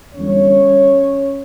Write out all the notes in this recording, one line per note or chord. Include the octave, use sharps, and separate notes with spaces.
E2 D3 G3 C#4 C#5